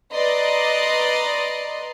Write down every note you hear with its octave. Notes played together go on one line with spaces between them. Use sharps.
B4 D5 D#5 A#5 C6